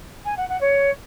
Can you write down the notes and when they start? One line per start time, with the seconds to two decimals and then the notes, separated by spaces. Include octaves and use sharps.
0.25 G#5
0.37 F#5
0.49 F#5
0.61 C#5